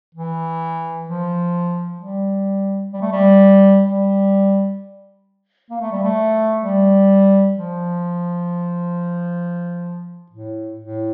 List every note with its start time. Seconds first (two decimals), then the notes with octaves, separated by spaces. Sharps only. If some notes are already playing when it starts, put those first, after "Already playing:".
0.15 E3
1.08 F3
2.00 G3
2.93 G3
3.02 A3
3.12 G3
3.85 G3
5.70 A#3
5.81 A3
5.92 G3
6.03 A3
6.62 G3
7.55 F3
10.31 A2
10.78 A2